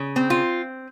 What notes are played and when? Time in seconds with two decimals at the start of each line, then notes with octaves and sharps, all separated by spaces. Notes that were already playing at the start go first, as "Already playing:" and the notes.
Already playing: C#3
0.16 C4
0.30 F4